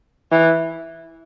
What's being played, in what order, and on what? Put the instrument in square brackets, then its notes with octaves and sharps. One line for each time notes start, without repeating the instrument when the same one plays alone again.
[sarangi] E3